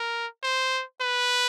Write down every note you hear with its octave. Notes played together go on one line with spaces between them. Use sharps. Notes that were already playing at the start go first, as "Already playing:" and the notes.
Already playing: A#4
C5
B4